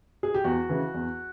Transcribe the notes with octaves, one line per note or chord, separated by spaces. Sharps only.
G#4
G4
E2 F#4
C#3 E3
E2